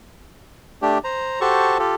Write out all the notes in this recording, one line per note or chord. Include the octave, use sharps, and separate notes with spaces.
A3 D4 G4
C5 A#5
F#4 G4 A4 C5 A5 C#6
F4 G4 A4